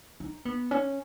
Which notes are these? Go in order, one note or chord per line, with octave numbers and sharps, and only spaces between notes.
D#4
B3
C#4